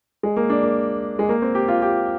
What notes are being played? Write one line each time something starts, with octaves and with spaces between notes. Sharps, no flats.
G#3
A#3
D4
A#3
G#3
A#3
C4
G4
F4
G4